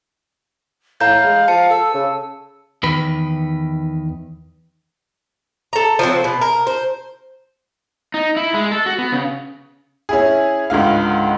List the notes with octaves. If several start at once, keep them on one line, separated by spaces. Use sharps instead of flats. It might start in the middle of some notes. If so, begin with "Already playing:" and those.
A2 F5 A#5 G6
G#3
F3 A5 C#7
A4 E6
C#3
E2 D#3 B4
A4 A#5
F3 F#3 C4
B2
A#4
C5
D#4
E4
G#3
A4
F#4
B3
C#3
C#4 E4 G#4
C#2 G#2 D3 F5